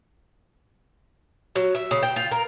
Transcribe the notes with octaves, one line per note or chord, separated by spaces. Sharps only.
F#3
E5
C#3
G5
F4
A#4